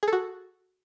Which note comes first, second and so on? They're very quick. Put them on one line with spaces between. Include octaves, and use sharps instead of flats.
G#4 A4 F#4